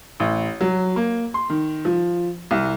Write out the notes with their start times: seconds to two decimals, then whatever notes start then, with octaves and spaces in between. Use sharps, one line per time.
0.20 A1
0.61 F#3
0.96 A#3
1.34 C6
1.50 D#3
1.85 F3
2.51 C2